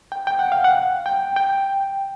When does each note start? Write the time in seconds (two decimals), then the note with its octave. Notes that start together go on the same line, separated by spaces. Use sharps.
0.12 G5
0.27 G5
0.39 F#5
0.52 F5
0.64 F#5
1.06 G5
1.36 G5